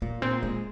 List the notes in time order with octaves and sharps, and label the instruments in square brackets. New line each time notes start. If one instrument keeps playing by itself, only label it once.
[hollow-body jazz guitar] A#2 [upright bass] A#3
[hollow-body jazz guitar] A#2 [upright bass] C4
[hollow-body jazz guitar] G#3 [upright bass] A#3